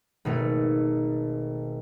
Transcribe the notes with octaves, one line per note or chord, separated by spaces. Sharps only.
G#1 B2 A3